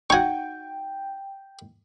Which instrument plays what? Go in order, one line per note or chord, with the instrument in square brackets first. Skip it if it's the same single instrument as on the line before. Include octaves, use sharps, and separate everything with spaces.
[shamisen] D#4 F#4 [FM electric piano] G5 [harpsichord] G#5 C#6